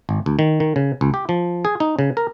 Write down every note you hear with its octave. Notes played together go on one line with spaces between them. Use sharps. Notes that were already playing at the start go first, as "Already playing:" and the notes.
G#1
D2
D#3
D#3
C#3
C#2
G4
F3
G#4
D#4
C#3
A#4